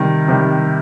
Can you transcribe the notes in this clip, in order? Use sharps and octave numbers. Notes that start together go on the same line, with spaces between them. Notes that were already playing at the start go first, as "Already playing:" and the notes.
Already playing: C3 D#3 G3
C3 D#3 G3